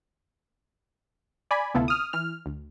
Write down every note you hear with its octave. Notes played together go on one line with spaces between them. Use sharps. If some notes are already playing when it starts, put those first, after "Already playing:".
D5 G#5 B5
D2 C3 B3 E4 F4 A4
D#6 F6
E3 F6
D2